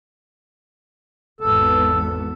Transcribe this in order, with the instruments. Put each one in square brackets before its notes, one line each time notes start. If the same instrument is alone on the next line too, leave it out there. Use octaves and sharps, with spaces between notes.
[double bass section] G#1 E2 B3 [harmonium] A4